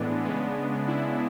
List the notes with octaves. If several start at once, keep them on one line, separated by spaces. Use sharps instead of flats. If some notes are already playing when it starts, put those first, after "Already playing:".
Already playing: A2 E3 G#3 B3 D4
C#3 G#3 B3
E4